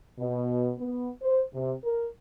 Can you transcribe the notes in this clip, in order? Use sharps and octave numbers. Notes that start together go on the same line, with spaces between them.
B2
B3
C5
C3
A#4